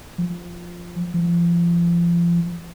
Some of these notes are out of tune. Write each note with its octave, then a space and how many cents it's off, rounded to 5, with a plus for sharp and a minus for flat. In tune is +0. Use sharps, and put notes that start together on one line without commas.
F3 +0
F3 -30